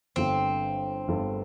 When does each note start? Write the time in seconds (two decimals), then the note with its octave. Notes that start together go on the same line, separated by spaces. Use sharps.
0.16 G1 G2 D3 C4
1.08 G1 G2 D3